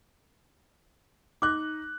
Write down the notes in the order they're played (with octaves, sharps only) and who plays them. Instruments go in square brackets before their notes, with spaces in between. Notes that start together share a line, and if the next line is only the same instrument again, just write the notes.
[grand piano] D#4 F#6 [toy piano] D6